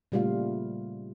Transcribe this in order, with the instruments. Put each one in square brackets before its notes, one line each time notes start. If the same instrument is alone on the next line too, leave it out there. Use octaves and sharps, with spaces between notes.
[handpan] A#2 C#3 G3 A3 F4 F5